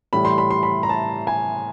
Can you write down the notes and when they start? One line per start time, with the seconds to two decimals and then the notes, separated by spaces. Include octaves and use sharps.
0.13 A2 E3 G3 B5
0.25 C6
0.38 B5
0.51 C6
0.63 B5
0.83 A#5
0.89 A5
1.27 G#5